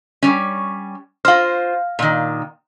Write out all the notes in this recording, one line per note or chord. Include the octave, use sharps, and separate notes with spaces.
G3 C#4
F4 C5 F5 F6
A#2 D#3